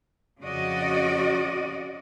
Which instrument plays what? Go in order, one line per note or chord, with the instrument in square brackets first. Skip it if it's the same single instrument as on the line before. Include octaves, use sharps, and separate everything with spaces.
[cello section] F2 C#3 F#4 D5 D#5